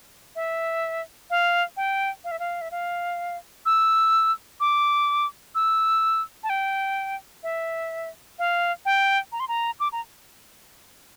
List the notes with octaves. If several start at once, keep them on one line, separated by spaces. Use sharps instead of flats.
E5
F5
G5
F5
E5
F5
E5
F5
E6
D6
E6
A5
G5
E5
F5
G5
A#5
C6
A#5
D6
A#5